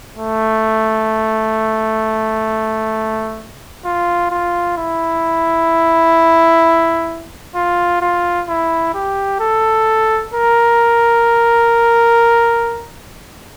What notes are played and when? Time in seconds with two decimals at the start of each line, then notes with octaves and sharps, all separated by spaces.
0.15 A3
3.85 F4
4.31 F4
4.77 E4
7.55 F4
8.01 F4
8.49 E4
8.94 G4
9.40 A4
10.34 A#4